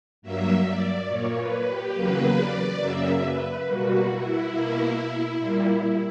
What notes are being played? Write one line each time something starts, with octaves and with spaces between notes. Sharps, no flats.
G2 F#3 A#3 E5
D5
A#2 A#3 C#5
B4
G4
E2 C#3 F#3 A#3 B4
D5
F#2 C#3 F#3 A#3 E5
B4
B2 G3 A#3 F#4
E4
B2 A#3
A#2 G3 A#3